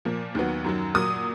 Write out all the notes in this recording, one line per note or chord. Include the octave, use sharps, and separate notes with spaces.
A#2 F3 A#3
D#2 D#3 F#3 B3
F#2 D#3 F#3
A#2 F#3 A#3 D#6